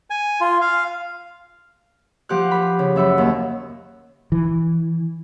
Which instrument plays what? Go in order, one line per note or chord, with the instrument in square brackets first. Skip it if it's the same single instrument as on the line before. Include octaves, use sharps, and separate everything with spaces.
[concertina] G#5
F4
F5
[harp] F3 G4 F#5 F#6
B4 B5
C#3
F#2 E5 F#5 B5
D#2 E6
[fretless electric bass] E3